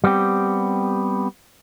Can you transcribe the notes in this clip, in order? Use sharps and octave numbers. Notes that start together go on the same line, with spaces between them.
G3 B3 C4 G4